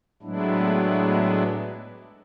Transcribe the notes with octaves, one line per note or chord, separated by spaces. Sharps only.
A2 F#3 G#3 B3 D4 E4